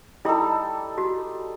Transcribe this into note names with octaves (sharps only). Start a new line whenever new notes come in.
G3 D#4 E4 A4
F#4